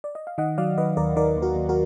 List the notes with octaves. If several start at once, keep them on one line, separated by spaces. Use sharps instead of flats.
D5
D#5
F5
D#3 D#5 F#5
F#3 D5 F5
D#3 B4 D#5
D#2 A#4 D5
D#3 A#4 D5
D#2
F#4 A#4
D#2
F#4 A#4